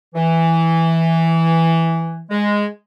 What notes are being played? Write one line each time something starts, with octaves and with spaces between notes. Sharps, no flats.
E3
G#3